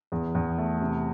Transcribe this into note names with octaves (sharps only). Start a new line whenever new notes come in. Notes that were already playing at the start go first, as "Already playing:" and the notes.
E2
E2
A3
C3